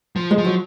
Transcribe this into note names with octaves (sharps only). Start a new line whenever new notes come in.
F3
G#3
F3
F#3